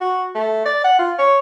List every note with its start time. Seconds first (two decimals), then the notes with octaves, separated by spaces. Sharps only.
0.01 F#4
0.35 A3
0.65 D5
0.84 F#5
0.99 F4
1.18 C#5